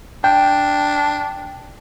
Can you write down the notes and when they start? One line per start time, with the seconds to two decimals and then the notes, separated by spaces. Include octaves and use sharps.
0.24 D4 G5